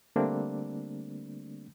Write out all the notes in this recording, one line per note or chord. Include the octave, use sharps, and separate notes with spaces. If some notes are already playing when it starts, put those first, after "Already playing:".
D3 G3 A3 A#3 C4 D4